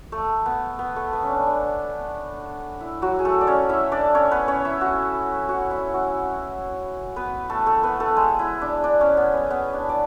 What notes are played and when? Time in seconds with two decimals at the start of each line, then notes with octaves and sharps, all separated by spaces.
0.12 A3
0.46 B3
0.79 B3
0.96 A3
1.13 B3
1.23 C#4
1.29 D4
1.46 D4
2.80 E4
3.02 F#3 F#4
3.19 G#4
3.25 A3 A4
3.41 D5
3.47 C#4 C#5
3.69 E4 E5
3.92 D4 D5
4.15 C#4 C#5
4.31 B3 B4
4.48 C#4 C#5
4.65 E4 E5
4.81 F#4 F#5
5.49 F#4 F#5
5.71 E4 E5
5.93 F#4 F#5
7.16 B3 B4
7.49 A3 A4
7.66 A3 A4
7.83 B3 B4
8.00 A3 A4
8.16 G#3 G#4
8.39 E4
8.62 D4
8.84 D4
9.01 C#4
9.17 B3
9.34 B3
9.50 B3
9.73 D4
9.89 D5